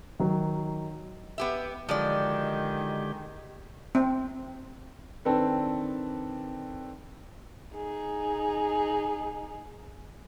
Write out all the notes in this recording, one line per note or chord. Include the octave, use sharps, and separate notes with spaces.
D#3 F#3
B3 G4 E5
D3 D#3 F3 F#3 G#3 G4 D5
C4
D#3 C4 D4 A4 B4
D#4 G#4